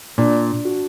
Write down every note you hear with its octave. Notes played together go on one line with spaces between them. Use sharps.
A#2 D4
F#4